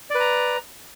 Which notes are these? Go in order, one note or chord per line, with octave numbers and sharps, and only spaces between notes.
B4 D5 A#5